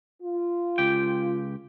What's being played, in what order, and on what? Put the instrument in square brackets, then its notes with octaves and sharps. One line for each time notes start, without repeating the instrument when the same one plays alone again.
[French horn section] F4
[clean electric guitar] C#2 G4 G5